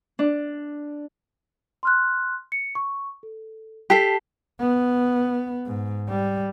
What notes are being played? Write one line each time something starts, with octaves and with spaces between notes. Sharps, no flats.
D4
C6 F6 F#6
C#7
C#6
A4
G4 A4 A5 B6 C7
B3
G#2
G3